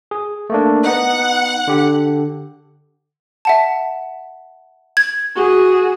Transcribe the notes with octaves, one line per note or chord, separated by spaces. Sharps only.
G#4
A3 A#3 D4
B3 D#4 F#5
D3 G4
E5 F#5 A5
G#6
F#4 G#4